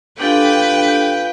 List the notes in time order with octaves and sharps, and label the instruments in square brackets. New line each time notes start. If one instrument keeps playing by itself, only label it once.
[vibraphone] D4 G4 A4 [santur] F4 G#5 D6 [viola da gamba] B4 [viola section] G5